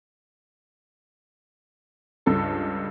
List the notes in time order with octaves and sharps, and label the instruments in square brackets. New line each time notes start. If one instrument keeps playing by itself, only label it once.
[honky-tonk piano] C#2 G2 A4 A5